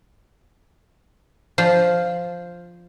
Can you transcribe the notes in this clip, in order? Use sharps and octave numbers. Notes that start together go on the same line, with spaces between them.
F3